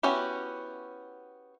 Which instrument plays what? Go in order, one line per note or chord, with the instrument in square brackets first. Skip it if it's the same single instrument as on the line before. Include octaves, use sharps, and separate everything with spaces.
[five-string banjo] B3 C#4 E4 F#4 G4